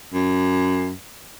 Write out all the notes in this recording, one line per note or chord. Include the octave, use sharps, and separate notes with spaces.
F#2